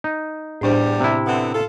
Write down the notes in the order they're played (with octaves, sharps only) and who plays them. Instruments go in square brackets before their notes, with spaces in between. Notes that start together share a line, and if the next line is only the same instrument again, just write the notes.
[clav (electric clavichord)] D#4
[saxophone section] E2 G3 [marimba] A2 D4 C5
[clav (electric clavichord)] C3 E4
[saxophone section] D3 B3 C4
F4 A4